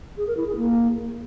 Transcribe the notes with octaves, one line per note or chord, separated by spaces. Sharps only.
G#4
A#4
E4
G#4
A#3